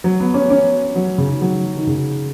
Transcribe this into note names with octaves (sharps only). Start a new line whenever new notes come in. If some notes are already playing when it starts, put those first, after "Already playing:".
F#3
B3
C#4
C#4
F#3
C#3
D#3
F#3
D#3
C#3